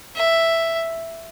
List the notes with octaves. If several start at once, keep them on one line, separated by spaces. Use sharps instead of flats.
E5